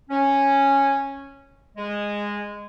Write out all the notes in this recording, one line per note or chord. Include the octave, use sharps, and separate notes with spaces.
C#4
G#3